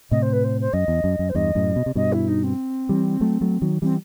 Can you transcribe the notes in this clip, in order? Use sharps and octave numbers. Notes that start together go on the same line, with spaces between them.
A2 C3 D#5
C5
B4
C5
C5
F#2 D#5
E2
F#2
F#2
C5
E2 G2 D#5
F#2 A2
B2
C3
G2 B2 D#5
E4
D#4
C4
E3 G3
F#3 A3
F#3 A3
D#3 F#3
E3 G3 C4